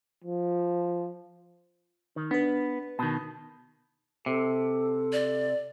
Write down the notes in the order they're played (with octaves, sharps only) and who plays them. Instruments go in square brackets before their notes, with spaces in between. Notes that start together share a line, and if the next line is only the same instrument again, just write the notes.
[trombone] F3
[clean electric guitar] D#3
[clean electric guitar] B3 [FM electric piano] D4 B4
[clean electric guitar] B2 D#3 [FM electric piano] A5
[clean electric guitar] C3 [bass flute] A4
[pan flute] D5